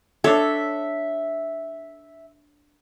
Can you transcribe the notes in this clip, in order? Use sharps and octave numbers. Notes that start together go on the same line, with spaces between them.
D4 A4 C#5 E5